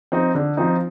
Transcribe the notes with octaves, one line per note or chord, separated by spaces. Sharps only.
F3 C4 D#4
D3
F3 C4 D#4